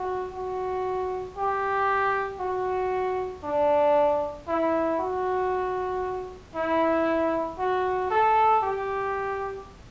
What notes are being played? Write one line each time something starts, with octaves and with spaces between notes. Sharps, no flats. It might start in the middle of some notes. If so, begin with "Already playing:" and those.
Already playing: F#4
F#4
G4
F#4
D4
E4
F#4
E4
F#4
A4
G4